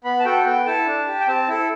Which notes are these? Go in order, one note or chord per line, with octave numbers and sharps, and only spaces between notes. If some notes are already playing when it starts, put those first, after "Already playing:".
B3 B5
A5
F#4 A4 G5
B3 G5
E4 A4 A5
D4
G4
G5
C4 A5
E4 A4